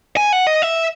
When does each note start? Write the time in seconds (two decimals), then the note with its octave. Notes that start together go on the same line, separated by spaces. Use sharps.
0.17 G#5
0.33 F#5
0.47 D#5
0.62 E5